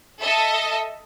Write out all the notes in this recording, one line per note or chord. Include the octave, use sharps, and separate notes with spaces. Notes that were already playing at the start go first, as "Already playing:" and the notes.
A4 D#5 E5